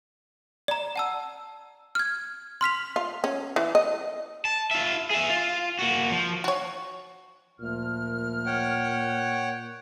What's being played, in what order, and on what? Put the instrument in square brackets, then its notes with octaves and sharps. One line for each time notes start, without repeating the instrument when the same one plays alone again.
[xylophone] D5 A#5
F#5 A5 E6
F6 G#6
C6 F6 B6 F7
[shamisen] F4
C#4
E3
D#5
[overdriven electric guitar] A5
F4 E5
G#4 E5
F4
A#3 F#4
F3
[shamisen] F#4 C#5
[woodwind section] D2 F3 F6 [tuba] A#2
[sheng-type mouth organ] C#5 F#5 G5